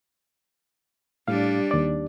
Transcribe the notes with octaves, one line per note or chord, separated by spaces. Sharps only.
A2 G3 D4 F5
D#2 D5